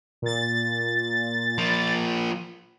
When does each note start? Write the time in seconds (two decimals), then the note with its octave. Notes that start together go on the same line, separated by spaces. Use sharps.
0.22 A#2 A6
1.58 F3 A#3